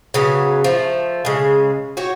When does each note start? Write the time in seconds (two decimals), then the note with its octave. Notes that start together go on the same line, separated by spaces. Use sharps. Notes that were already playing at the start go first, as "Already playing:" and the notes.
0.14 C#3 F#3 B3
0.64 F3 A3
1.25 C#3 G#3
1.97 F#4 G4 C#5